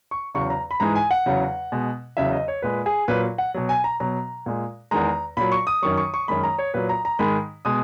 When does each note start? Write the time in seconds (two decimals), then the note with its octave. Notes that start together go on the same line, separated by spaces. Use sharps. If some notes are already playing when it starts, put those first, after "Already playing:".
0.11 C#6
0.34 E2 C#3 F#3 C#6
0.50 A#5
0.71 B5
0.80 G#2 E3 G#3 A#5
0.95 G#5
1.11 F#5
1.26 E2 C#3 F#3
1.72 B2 G#3
2.17 E2 C#3 F#3 E5
2.32 D#5
2.48 C#5
2.62 A#2 G#3 B4
2.86 G#4
3.08 A#2 F#3 B4
3.38 F#5
3.54 B2 F#3
3.69 G#5
3.84 A#5
4.00 B2 F#3 A#5
4.46 A#2 G#3
4.91 E2 D#3 G#3 A#5
5.37 A#2 F#3 B5
5.52 C#6
5.67 D#6
5.82 F#2 D#3 F#3 C#6
5.97 C#6
6.14 C#6
6.28 F#2 D#3 G#3 B5
6.44 A#5
6.59 C#5
6.74 A#2 F#3 B4
6.89 A#5
7.05 A#5
7.19 G#2 D#3 G#3 B5
7.65 B2 G#3 D#6